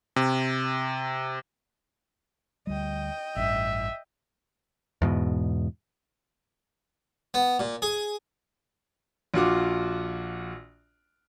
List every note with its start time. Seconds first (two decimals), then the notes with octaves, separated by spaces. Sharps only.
0.16 C3
2.67 D2 G3 D#5 G5
3.36 A1 G2 E5
5.02 E2 G#2 B2
7.34 B3
7.59 A#2
7.82 G#4
9.34 A#1 F4 F#4 D6